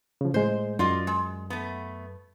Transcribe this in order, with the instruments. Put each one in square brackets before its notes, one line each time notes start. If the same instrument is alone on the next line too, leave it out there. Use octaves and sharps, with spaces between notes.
[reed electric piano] C#3 F3
[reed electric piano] A2 G#3 [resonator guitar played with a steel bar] C5
[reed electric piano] F#2 [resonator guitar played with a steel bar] F4 D5 D#5
[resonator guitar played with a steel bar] G#3
A3 B3